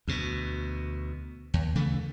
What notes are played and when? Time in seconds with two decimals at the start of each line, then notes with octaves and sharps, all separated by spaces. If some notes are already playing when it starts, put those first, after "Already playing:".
0.08 D2 B2
1.54 D#2
1.75 C#3 E3 A3